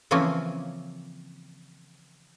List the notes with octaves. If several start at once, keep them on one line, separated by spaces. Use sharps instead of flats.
C#3 E3 F3 A#3 C4 C#4